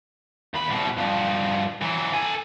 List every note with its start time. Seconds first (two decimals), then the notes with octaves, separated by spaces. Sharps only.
0.55 D#2 B5
0.70 C2 B2
0.98 G2 F3
1.82 E3 F#3
2.13 A4 G#5